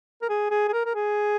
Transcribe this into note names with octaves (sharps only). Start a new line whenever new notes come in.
A#4
G#4
G#4
G#4
A#4
A#4
G#4